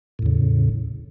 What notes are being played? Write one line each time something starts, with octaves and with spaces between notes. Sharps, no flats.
E2 A2 C#3